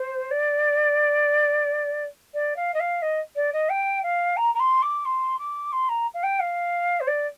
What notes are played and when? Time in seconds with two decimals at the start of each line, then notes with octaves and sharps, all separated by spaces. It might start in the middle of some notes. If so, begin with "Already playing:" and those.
Already playing: C5
0.31 D5
2.34 D5
2.56 F5
2.74 D#5
2.79 F5
3.02 D#5
3.35 D5
3.53 D#5
3.69 G5
4.03 F5
4.36 A#5
4.54 A#5
4.59 C6
4.82 D6
5.05 C6
5.38 D6
5.72 C6
5.89 A#5
6.14 F5
6.23 G5
6.39 F5
7.00 C5
7.07 D5